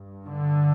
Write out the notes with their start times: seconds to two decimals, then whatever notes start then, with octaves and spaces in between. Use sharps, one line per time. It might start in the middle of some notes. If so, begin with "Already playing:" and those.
Already playing: G2
0.26 D3